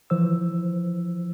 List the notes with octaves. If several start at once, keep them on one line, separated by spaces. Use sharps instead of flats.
E3 F3 C5 E6